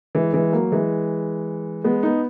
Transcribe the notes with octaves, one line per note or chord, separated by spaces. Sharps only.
E3 G#3
E3 G#3
F#3 A#3
E3 G#3
G#3 B3
B3 D#4